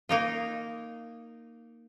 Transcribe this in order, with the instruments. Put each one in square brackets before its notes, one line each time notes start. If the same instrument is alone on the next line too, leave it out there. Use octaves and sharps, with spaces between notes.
[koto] A#3 D#4 F4